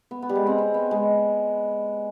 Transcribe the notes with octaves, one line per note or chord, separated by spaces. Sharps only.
B3
B3
G3
G#3
C4
C4
B3
G#3